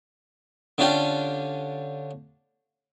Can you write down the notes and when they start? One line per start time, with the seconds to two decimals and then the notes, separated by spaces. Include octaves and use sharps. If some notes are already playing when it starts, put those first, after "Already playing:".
0.78 D3 C#4 D4 F4 G4